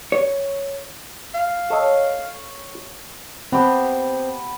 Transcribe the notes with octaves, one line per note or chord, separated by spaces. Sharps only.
C#5
F5
A4 C#5 D#5
B3 C4 G4 A5